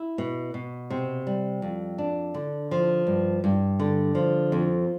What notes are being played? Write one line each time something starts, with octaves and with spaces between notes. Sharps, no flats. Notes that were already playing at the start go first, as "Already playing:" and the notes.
Already playing: E4
B2
B2
C3
G3
F2
D4
D3
F3
G2
G2
D3
F3
F2